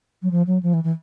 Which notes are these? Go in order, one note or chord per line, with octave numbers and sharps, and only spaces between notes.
F#3
F3
F#3
F3
E3
E3